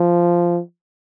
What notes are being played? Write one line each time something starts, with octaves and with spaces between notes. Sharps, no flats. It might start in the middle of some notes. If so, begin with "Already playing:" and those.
Already playing: F3